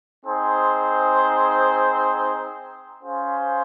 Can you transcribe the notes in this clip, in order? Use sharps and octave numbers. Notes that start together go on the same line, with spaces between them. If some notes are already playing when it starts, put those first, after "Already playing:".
C4 D#4 G#4 C5
C#4 F4 G#4 C5